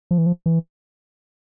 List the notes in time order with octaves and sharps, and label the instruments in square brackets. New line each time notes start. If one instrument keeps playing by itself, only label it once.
[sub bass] F3
E3
F3
E3